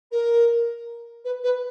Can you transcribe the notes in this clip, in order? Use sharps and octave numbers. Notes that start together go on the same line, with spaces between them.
A#4
B4
B4